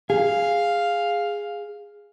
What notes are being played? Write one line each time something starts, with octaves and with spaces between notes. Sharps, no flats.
G#4 F5